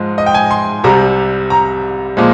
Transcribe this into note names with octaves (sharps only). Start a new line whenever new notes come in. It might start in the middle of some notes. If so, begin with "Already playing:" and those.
Already playing: G#2 F3 G#3
D#5
G5
G#5
C6
C2 C3 G3 A#5
A#5
A#2 F3 G#3